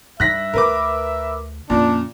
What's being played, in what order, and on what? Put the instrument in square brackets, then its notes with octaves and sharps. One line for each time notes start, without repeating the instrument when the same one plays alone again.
[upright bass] G2 G3 [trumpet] E5 [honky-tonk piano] F#6 A#6 B6
[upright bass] D2 [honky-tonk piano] A#4 B4 D6
[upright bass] F2 C#4 [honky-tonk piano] A#2 [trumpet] D4